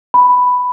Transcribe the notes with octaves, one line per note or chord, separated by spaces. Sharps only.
B5